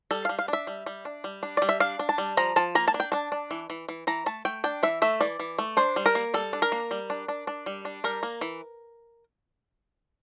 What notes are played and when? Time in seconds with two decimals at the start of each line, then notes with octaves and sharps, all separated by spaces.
0.11 G3 A4
0.25 G3 F5
0.39 F5
0.48 D4 E5
0.67 G3
0.86 G3
1.05 D4
1.24 G3
1.43 D4
1.57 G3 D5
1.69 E5
1.80 D4 F5
1.99 D4
2.09 A5
2.18 G3
2.37 F3 A#5
2.56 F3 A5
2.75 A#3 A#5
2.88 A5
2.94 D4
3.00 G5
3.12 D4 A5
3.32 D4
3.51 E3
3.70 E3
3.89 E3
4.07 E3 A#5
4.26 A3 A5
4.45 A3 G5
4.64 D4 G5
4.83 E3 E5
5.02 A3 E5
5.21 E3 D5
5.40 E3
5.59 A3
5.77 D4 C5
5.96 G3
6.06 A#4
6.15 A#3
6.34 G3 A4
6.53 D4
6.62 A#4
6.72 A#3
6.91 G3
7.10 D4
7.28 D4
7.47 D4
7.66 G3
7.85 D4
8.04 G3 A#4
8.23 A#3
8.41 E3